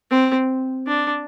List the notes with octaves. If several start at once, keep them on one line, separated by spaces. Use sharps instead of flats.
C4
D4